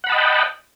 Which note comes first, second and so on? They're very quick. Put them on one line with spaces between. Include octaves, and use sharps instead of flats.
F#5 B5 A5 D#5 G5